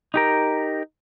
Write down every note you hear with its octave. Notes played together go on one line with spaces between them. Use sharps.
D#4 G4 A#4